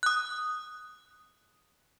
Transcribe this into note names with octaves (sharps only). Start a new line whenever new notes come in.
D#6 F#6